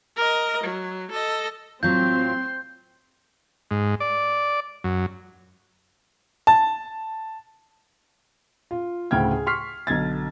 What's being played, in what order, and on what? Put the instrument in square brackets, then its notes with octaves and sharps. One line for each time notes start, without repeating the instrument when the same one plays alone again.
[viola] A#4 D#5
F#3
A4 D#5
[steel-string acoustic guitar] A2 F#3 F4 [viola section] C4 C6 [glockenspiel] G6
[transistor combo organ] G#2
D5
F#2
[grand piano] A5
[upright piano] F4
D2 A2 C#3 G5 F6 G#6
G#4
C6 C#6 F6 B6 C7
B1 D3 G#6 A6